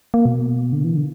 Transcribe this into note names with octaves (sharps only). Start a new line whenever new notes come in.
A#3
B2
D3
E3
D3